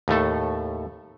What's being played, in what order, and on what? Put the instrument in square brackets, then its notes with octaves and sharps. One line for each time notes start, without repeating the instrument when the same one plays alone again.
[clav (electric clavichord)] D#2 A2 A3 A4